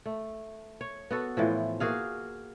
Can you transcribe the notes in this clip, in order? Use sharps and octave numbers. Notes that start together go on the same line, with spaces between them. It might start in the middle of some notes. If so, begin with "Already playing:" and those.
A3
C#5
B3 F#4 A4
A2 E3 F3
A#3 F#4 G#4 F5